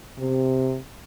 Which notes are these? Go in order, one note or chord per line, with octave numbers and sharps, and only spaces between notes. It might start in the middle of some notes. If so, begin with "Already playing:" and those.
C3